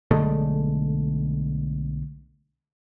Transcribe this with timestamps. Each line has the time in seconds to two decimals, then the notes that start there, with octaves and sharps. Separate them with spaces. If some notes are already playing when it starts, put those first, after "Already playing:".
0.11 B1 D3 G#3 A3